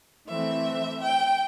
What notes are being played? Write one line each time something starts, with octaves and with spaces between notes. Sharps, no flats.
E3 A3 C4 E5
G5